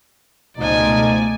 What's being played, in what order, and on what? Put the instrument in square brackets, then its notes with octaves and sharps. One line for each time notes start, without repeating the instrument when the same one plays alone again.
[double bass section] C#2 B2 A3 [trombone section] F3 D#4 [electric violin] D5 G#5